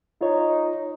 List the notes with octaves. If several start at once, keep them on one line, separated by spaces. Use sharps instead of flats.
D#4 F4 C#5